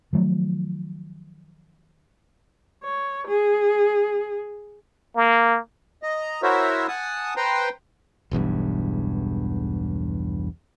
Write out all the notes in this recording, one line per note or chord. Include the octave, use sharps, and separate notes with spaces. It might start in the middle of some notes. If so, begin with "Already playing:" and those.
D#3 F3 F#3 A3
C#5
G#4
A#3
D#5 A#5
E4 F#4 A#4 C5 C#5 E5
F#5 G#5 A5 D#6
B4 C5 G5 A#5 C6
E1 B1 E2 G2